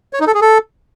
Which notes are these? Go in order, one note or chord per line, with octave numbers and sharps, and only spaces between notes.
C#5
D#4
A4
G#4
A4